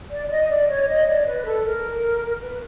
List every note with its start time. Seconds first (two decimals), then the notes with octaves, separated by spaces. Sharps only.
0.10 D5
0.26 D5
0.30 D#5
0.49 D5
0.67 C#5
0.87 D#5
1.07 D5
1.25 B4
1.45 A4
1.64 A#4
2.40 B4